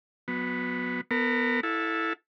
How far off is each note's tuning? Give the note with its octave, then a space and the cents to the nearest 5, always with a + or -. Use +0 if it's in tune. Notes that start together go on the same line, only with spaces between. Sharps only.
F#3 -25 B3 +0
B3 +0 A#4 -30
E4 +0 A4 +0 F5 +40